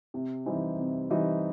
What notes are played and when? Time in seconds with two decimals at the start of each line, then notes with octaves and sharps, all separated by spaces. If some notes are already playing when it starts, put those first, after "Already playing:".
0.14 C3
0.46 E3 G3 C4 D#4
0.78 C3
1.10 E3 G3 C4 D#4